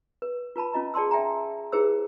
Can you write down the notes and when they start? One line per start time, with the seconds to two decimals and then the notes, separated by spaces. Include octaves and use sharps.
0.22 B4
0.56 F4 B4 A5 B5
0.73 C#4 F4 D#5 A#5
0.94 G#4 D5 A5 C6 E6
1.11 D5 E5 G5 G#5 A#5
1.72 E4 G4 G#4 B4 C5 E6